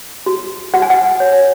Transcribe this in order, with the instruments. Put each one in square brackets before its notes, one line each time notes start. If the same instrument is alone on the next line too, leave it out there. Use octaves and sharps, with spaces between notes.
[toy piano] F#4
F#4 F#5
G#5
F#5
C#5